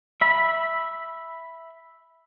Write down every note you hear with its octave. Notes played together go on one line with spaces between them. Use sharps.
E5 B5